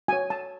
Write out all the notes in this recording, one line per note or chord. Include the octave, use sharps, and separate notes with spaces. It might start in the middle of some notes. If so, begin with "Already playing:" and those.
F#4 C#5 G#5
A5